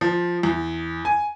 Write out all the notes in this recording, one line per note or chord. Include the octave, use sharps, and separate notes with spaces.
F3
E2
G#5